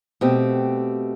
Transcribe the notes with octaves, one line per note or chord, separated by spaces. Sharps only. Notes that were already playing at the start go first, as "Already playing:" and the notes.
B2 A3 C4 G4